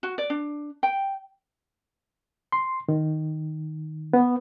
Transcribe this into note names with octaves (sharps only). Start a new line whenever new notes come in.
F#4
D5
D4
G5
C6
D#3
B3